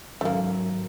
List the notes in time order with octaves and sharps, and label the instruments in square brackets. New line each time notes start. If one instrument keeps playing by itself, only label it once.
[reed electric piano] G#2 D#3 C#4 [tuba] F#3 [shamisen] A3 A#3